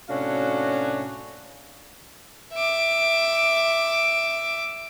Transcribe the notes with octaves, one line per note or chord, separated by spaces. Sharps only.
A2 C3 C#4 D4 F#4 F5
E5 D6